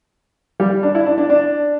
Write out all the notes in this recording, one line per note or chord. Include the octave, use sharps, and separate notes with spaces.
G3
D4
E4
D4
D4
D4